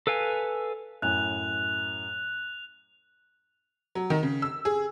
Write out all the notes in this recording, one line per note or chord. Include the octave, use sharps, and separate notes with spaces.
A4 B4 F5 G#5
F#2 A2 G#5 F#6 F7
F#3
D#3
C#3
E6
G#4